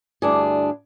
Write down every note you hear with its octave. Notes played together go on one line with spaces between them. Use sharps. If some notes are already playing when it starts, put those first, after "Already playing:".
D2 G2 D4 E4 G#4